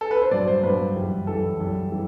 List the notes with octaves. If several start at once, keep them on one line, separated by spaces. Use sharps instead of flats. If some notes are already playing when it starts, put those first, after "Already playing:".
A4
B4
C5
G2 F#3 D5
C5
G2 F#3 B4
F#2 E3 G3
F#2 E3 G3 A4
F#2 E3 G3
E3 G3